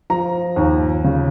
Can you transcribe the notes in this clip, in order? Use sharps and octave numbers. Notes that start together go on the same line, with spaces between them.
F3 A#5
D#2
C#3